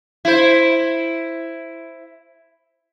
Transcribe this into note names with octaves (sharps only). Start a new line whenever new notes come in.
E4 C5